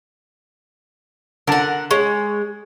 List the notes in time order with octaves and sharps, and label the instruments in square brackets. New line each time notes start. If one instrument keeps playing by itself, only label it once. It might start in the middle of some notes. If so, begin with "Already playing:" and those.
[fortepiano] D3 A5 [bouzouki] A#4 F#5
[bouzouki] G#3 [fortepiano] C#5